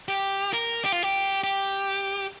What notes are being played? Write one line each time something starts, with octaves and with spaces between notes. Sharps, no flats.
G4
A#4
G4
F4
G4
G4